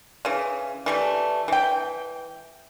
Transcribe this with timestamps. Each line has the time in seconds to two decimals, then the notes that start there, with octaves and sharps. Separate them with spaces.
0.25 C#3 E3
0.86 E3 G3 A3
1.48 E3 G5